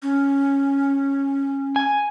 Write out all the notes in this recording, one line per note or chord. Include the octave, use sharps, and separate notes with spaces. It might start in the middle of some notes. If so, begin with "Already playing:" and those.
C#4
G#5